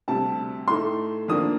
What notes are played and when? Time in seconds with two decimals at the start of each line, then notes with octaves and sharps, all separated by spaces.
0.08 D2 C3 G3 A5
0.68 A2 A3 D#4 C6
1.28 F2 D#3 A#3 D4 D#6